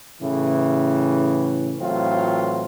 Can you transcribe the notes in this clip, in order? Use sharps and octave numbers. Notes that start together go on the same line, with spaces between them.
A2 C#3 E3
A2 E3 F#3 C4 F4